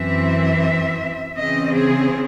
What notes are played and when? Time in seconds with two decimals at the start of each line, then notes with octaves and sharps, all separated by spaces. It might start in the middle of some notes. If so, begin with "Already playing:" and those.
Already playing: F#2 E3 C4 E5
1.37 C#3 E3 C4 D#5
1.75 G#4